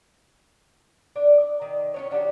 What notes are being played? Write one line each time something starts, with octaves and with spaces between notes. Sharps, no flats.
D4
D5
D#3
C#4 D4 C#5
D#3 D4 F#4 G4